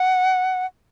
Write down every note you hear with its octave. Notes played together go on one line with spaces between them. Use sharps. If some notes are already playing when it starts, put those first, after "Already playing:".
Already playing: F#5